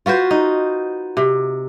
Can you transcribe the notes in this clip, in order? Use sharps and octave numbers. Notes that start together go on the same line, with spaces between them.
F4 F#4 B4 C5
D#4
C3